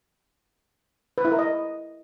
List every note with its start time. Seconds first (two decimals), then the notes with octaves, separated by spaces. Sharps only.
1.18 B4
1.25 E4
1.32 A#4
1.39 D#5